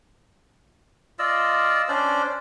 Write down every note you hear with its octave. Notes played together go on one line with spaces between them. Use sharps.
F4 D5 D#5 E6
C#4 D4 C5 D5